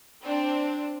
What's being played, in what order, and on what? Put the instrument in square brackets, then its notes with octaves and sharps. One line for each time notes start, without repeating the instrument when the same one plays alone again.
[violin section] C4 D4